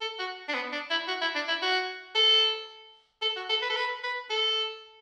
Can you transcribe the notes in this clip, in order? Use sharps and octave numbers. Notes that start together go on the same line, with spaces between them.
A4
F#4
D4
B3
D4
E4
F#4
E4
D4
E4
F#4
A4
A4
F#4
A4
B4
A4
B4
B4
A4